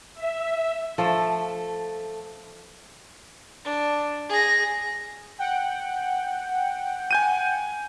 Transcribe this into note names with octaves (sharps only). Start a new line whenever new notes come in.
E5
F3 A3 A4
D4
G#4 A#6
F#5 G5
G#5 G6 D#7